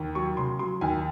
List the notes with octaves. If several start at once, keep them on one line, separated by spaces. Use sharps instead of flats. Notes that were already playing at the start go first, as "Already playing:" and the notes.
Already playing: D#2
F#3 C#6
C#3 C6
F#3 C6
D#2 G#5